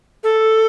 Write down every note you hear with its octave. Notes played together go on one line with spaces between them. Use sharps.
A4